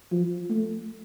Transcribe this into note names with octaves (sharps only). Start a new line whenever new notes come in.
F3
A3